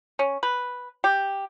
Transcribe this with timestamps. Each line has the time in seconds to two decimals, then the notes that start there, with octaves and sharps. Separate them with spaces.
0.19 C#4
0.43 B4
1.04 G4